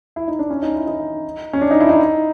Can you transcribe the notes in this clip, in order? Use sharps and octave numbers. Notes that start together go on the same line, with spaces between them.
E4
D#4
D4
C#4
D#4
E4
D#4
C#4
D4
D#4
E4
D#4